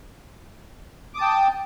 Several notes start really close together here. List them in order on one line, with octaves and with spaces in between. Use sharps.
D6 D#6 A5 G5